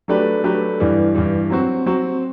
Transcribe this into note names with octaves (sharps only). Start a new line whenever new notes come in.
F#3 A3 D4 G4 B4
F#3 A3 D4 G4 B4
G2 E3 G3
G2 E3 G3
F#3 C4 F#4
F#3 C4 F#4